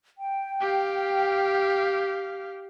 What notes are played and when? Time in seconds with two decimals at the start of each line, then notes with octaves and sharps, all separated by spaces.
0.17 G5
0.61 G4 F5